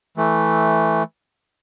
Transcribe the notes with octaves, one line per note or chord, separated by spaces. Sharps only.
E3 A3